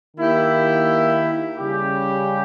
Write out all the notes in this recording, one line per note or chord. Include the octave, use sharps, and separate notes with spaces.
D#3 A#3 E4 G4
C#3 G3 C#4 G4